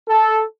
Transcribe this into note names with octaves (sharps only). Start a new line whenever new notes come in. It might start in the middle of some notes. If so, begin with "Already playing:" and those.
A4